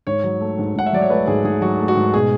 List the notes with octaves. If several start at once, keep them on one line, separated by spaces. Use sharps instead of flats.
G#2 C#5
F#3
A3
G#2
G#2 F#5
E5
F#3 D5
C#5
A3 B4
G#2 G#4
G#2 G#4
F#3 F#4
A3
F#4
G#2
B2 G#4